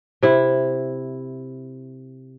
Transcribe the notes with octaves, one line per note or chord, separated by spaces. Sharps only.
C3 E4